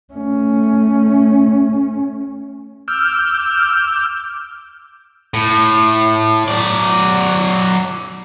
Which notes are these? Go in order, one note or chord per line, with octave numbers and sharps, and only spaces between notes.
A3 C#4
D6 E6 F6 G6
A2
F#3 D5